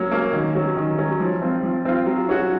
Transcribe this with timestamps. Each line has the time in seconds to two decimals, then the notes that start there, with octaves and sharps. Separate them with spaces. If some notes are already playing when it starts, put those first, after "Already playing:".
Already playing: F#3 A#3 C#4
0.11 A#3 C#4
0.33 D#3
0.55 F#3 C#4
0.76 D#3
0.98 F#3 C#4
1.20 F3
1.42 C4 F4
1.63 F3
1.85 C4 F4
2.06 F#3
2.29 C#4 F#4